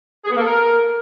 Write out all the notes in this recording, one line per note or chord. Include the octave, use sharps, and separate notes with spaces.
G#4
B3
A#3
A4
A#4